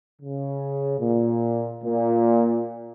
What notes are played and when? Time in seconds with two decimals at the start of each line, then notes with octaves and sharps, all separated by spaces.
0.22 C#3
0.99 A#2
1.84 A#2